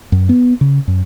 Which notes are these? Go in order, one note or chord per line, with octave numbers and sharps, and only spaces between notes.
F#2
B3
C#3
F#2